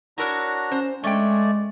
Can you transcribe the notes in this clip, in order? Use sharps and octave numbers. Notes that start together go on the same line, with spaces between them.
D4 E4 F#4 A#4 C#5 A#5
C#4 C5
G#3 A3 C#4 D5 G5